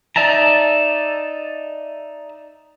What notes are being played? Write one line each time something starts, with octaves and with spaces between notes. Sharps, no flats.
D#4 D5 E5 A5 A#5